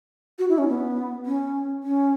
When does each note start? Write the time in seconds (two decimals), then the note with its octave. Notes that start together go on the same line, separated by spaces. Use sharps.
0.39 F#4
0.49 E4
0.58 C#4
0.69 B3
1.26 C#4
1.83 C#4